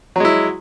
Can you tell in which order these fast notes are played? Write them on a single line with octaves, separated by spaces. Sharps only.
F#3 G#3 E4